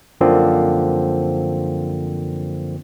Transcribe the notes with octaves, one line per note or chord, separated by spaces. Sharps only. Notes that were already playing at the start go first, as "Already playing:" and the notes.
F#2 D3 F3 A#3 C4